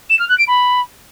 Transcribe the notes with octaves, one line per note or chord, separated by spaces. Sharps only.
E7
F6
F#6
D7
B5